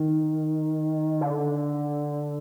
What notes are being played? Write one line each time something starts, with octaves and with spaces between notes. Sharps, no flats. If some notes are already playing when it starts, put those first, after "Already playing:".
Already playing: D#3
D3